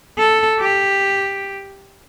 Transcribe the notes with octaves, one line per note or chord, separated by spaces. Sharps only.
A4
G4